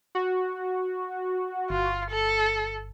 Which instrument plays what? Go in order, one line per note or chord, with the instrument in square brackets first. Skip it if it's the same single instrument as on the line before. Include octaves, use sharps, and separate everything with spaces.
[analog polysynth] F#4
[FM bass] G1 [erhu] F4
[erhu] A4